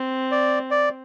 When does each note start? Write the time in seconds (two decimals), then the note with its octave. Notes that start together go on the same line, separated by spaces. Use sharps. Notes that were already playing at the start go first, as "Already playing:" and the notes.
Already playing: C4
0.31 D5
0.71 D5